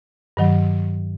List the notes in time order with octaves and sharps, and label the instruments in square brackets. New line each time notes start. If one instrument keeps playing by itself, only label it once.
[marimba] G2 D#3 F#3